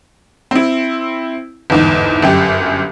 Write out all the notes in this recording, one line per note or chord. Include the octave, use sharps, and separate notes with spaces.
C4 E4
G1 E2 G#2
G1 F#2 G4